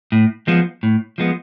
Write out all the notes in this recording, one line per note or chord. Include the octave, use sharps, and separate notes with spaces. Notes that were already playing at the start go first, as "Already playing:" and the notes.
A2
F3 G#3 B3
A2
F3 G#3 B3